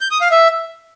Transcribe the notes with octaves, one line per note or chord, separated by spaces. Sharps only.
G6
D#6
F5
E5